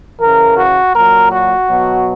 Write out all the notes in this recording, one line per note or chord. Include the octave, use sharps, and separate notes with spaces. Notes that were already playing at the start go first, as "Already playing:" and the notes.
C#3 E3 A#4
F#4
A#2 F#3 A#4
F#4
B2 F#3